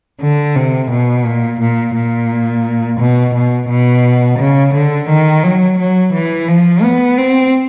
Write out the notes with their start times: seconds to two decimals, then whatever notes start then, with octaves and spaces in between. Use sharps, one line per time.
0.21 D3
0.55 C3
0.91 B2
1.25 A#2
1.60 A#2
1.95 A#2
3.00 B2
3.34 B2
3.69 B2
4.39 C#3
4.74 D3
5.09 D#3
5.44 F#3
5.78 F#3
6.13 E3
6.48 F3
6.83 B3
7.18 C4